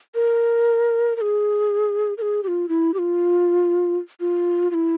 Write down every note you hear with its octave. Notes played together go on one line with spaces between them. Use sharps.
A#4
A#4
G#4
A#4
G#4
G4
F4
E4
G4
F4
F4
F4
E4